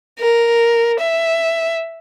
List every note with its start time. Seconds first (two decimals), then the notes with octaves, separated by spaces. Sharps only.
0.19 A#4
1.00 E5